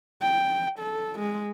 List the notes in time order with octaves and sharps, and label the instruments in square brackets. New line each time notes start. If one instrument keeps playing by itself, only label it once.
[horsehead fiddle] G5
A4
G#3